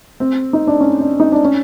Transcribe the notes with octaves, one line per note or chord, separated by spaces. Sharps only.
C4
D#4
D4
C#4
D4
D#4
D4
C#4